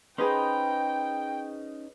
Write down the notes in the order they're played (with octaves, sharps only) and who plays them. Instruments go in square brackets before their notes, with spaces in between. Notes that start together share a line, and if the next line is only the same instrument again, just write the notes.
[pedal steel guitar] C#4 D#4 D#5 [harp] G#4 B4 C5 [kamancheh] G5